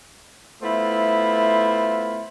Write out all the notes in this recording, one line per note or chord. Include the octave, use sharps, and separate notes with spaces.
A3 B3 E4 F4 C5